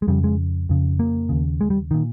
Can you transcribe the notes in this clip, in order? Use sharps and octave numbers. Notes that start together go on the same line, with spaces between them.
G#3
F2 C#3 G3
G#3
F2 C#3
A#3
D#2 C#3
G#3
G3
A#2 D#3